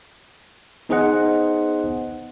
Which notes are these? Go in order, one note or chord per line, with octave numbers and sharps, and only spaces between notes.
B3 D#4 G#4 C5 D#5 F#5